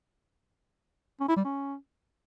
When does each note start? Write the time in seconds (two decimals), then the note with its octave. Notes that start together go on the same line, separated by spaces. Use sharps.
1.20 C#4
1.28 E4
1.36 G3
1.45 C#4